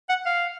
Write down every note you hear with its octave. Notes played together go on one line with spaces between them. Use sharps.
F#5
F5